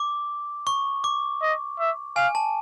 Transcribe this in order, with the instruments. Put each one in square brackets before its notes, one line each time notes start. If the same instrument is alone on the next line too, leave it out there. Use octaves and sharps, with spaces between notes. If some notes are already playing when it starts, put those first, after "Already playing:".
Already playing: [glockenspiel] D6
C#6
D6
[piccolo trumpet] D#5
E5
[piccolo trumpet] F5 [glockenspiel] G#5
[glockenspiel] A5